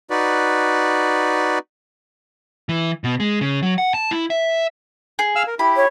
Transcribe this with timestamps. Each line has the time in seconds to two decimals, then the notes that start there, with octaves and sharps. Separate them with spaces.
0.10 D#4 F#4 B4 D5
2.69 E3
3.04 B2
3.20 G#3
3.41 C#3
3.63 F#3
3.78 F#5
3.94 A5
4.11 E4
4.30 E5
5.19 G#4
5.36 F5 E6 F6
5.47 A#4
5.59 E4 G4 B5
5.76 C#5